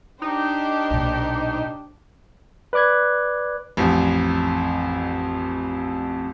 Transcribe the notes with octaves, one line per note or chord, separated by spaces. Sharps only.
D4 D#4 G4 C5
B1 A#2
B4 D5 D6 F#6 G#6
A1 F2